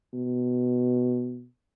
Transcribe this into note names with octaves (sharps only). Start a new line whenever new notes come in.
B2